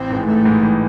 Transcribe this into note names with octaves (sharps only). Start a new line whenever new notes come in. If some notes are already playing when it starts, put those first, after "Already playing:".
Already playing: A1 C4
G#2 E3 G#3
A1 A3
G#2 E3 G#3
A1